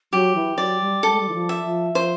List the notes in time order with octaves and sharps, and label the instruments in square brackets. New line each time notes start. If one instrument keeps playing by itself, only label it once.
[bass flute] F#3 [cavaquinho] G4
[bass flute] E3
[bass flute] F#3 [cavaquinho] D5
[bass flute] G3
[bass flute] G3 [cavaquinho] A4
[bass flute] G#3
G3
E3
F3
[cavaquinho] E5
[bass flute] F3
[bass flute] F3 [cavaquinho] C5